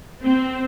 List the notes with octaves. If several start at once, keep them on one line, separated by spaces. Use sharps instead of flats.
C4